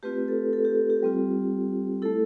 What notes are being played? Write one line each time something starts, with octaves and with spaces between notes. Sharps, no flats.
A3 C4 F4 G4 B4
A4
A4
G4
G4
G3 C4 F4
A3 E4 A4